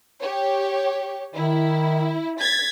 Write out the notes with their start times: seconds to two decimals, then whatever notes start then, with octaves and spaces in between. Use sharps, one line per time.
0.22 G4 C#5
1.35 D#3 E4
2.40 G#6 A6 B6